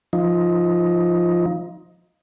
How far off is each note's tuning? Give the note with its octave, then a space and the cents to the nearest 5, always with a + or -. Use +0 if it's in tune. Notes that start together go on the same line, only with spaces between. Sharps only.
F3 +0 D#4 +15